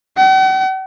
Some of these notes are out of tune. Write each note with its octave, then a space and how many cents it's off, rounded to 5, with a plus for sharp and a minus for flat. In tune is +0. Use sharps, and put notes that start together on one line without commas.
F#5 +45